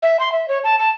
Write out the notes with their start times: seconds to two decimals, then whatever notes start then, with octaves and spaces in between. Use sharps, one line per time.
0.02 E5
0.20 C6
0.32 E5
0.48 C#5
0.64 A5
0.79 A5